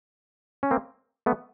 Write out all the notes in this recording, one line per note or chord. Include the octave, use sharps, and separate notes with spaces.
C#4
A#3 C4
A3 B3